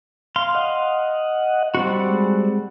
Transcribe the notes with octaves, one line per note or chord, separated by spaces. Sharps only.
F5 C6
D#5 F#5
G3 C4 F#4
G#3